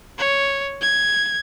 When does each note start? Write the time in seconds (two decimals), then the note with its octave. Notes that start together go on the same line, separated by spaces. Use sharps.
0.18 C#5
0.81 G#6